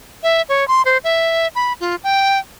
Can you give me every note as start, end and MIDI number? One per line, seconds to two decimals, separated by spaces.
0.23 0.42 76
0.49 0.67 73
0.68 0.82 84
0.85 0.98 72
1.04 1.48 76
1.55 1.73 83
1.81 1.96 65
2.04 2.39 79